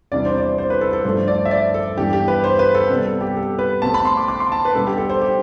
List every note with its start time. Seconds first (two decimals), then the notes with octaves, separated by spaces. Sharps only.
0.12 E2 C3 G3 D4 D5
0.25 C5
0.38 D5
0.58 C5
0.70 B4
0.81 A4
0.93 A4
1.04 G2 F3 A3 D4 C5
1.28 D5
1.45 E5
1.51 D5
1.74 A4
1.97 G2 E3 B3 D4 G4
2.13 G4
2.28 B4
2.44 C5
2.59 B4
2.75 A4
2.89 C3 G3 B3
3.05 A4
3.21 G4
3.36 A4
3.59 B4
3.82 B2 A3 C4 A5
3.94 B5
4.05 C6
4.17 D6
4.28 D6
4.40 C6
4.52 A5
4.65 B4
4.75 B2 G3 B3 D4 A4
4.87 G4
4.98 A4
5.09 C5
5.22 G4